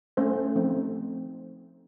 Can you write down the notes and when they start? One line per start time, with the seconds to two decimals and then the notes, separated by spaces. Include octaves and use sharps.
0.17 A3 C#4 A4 C5
0.56 F3 A3 C4 D#4